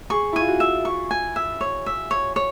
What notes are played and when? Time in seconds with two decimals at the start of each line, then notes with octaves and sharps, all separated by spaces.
0.10 G#4 C#6
0.33 E4
0.36 F4 G#5
0.48 F#4
0.60 E5
0.85 C#6
1.11 G#5
1.36 E5
1.61 C#5
1.86 E5
2.11 C#5
2.36 C#5